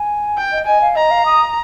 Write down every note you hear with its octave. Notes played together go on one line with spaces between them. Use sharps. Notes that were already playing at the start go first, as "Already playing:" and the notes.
Already playing: G#5
G5
D#5
D#5 G#5
F5
D#5 A#5
F5
D#6